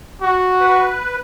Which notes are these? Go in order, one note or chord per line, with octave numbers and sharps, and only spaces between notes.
F#4
B4